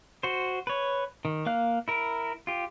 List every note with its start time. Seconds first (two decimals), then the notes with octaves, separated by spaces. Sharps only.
0.23 F#4 C5
0.67 B4 C#5
1.25 D#3
1.46 A#3 F5 F#6
1.88 E4 A#4
2.47 F4 G4